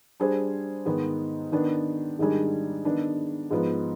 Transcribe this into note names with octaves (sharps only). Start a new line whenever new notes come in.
G3 D4 G#4 C5
G#2 D#3 G#3 B3
D#3 B3 D4
G#2 D#3 G3 D4 G#4
D#3 B3 D4
G#2 F3 B3